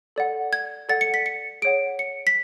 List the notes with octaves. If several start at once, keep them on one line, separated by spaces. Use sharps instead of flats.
A4 D5 F#5
G#6
A4 D5 F#5 A6
C#7
B6
C#7
G#4 C#5 F#5 D7
C#7
B6